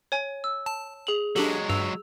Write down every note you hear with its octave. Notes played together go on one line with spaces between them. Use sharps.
C#5 G#5
E6
A5
G#4 F7 F#7
F#3 G#3 D4 G4 A4 F#7
G2 E6 F7